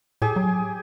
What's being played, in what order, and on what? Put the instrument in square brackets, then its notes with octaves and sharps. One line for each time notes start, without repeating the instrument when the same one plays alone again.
[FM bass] A2 [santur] G4 G#4
[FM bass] F#3